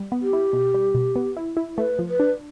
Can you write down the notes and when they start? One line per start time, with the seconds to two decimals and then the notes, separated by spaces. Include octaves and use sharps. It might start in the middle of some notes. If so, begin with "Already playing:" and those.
Already playing: G3
0.12 B3
0.22 G4
0.33 E4
0.53 B2
0.74 G3
0.95 B2
1.16 B3
1.37 E4
1.57 E4
1.77 A3 B4
1.99 F3
2.09 B4
2.20 D4